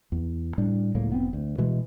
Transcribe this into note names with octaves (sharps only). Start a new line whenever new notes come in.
E2
A2 G3 D4
C#2 A2 F#3 A#3
F1 B3 C4
D2
B2 E3 G#3